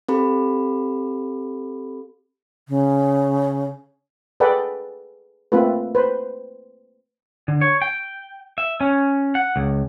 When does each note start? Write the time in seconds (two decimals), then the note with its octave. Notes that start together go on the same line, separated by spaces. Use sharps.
0.09 C4 G4 A4 B5
2.69 C#3
4.40 G#4 A4 B4 D5 F#5 G5
5.52 A3 A#3 C4 F4 A4 B4
5.95 B4 C5
7.48 D3
7.61 C#5
7.82 G5
8.58 E5
8.81 C#4
9.35 F#5
9.56 C#2